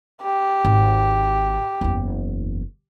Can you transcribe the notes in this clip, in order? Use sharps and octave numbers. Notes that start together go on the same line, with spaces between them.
G4
G#1
F#1 E2